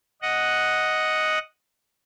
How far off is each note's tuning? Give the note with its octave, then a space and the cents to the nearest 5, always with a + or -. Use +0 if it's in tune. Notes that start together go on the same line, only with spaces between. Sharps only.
D#5 +0 F#5 +0